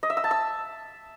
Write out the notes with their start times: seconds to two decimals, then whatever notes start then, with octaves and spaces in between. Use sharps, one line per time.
0.03 D#5
0.10 E5
0.17 E6
0.24 A5
0.31 E6